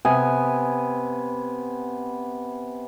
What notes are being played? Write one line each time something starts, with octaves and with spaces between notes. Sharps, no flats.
C3 B3 G#5